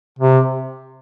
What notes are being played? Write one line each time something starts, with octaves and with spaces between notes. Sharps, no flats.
C3